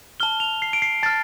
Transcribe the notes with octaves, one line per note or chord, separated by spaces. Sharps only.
A5 F6 G7
F7
C7
D7
C7
A5 F6 A6